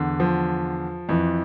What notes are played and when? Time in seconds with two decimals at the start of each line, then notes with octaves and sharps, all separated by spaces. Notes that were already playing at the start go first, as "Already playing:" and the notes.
Already playing: E2 D3
0.20 F3
1.09 F2 E3